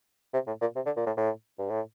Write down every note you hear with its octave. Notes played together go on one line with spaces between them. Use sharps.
C3
A2
A#2
C3
D3
A#2
A2
A2
G2
A2